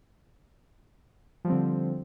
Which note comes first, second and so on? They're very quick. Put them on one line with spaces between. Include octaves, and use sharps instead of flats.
F3 G3 C4 D3